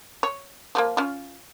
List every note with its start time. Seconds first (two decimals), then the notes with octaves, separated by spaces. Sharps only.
0.23 C#5
0.75 F3 A3 A#3
0.97 C#4 F4